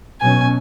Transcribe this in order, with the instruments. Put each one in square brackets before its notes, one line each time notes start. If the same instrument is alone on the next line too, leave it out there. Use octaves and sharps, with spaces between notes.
[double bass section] B2 F#3 C#4 [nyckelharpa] G#5